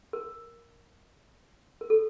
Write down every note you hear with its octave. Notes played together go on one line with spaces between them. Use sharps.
A#4
A#4
A4